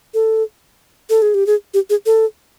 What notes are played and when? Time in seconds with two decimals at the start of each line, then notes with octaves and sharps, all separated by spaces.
0.14 A4
1.10 A4
1.22 G#4
1.34 G4
1.47 G#4
1.74 G4
1.90 G#4
2.06 A4